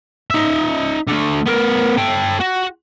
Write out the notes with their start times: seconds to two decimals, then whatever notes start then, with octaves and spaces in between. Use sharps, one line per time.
0.31 D#4 E5
1.07 D3 A3
1.46 B3 A#4
1.98 A4 G5
2.40 F#4